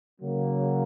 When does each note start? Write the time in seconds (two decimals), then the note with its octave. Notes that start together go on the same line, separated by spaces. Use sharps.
0.20 C#3 F#3 A#3